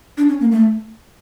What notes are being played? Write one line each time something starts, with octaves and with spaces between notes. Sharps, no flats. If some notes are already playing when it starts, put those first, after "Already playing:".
D4
C#4
A#3
A3